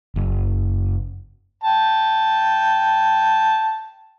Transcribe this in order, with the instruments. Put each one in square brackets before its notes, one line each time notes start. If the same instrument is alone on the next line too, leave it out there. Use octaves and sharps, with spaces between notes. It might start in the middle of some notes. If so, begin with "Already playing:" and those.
[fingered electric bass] F#1
[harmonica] G5 A5